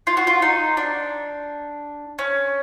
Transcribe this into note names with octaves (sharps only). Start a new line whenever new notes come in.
F4
F#4
F4
D#4
D4
C#4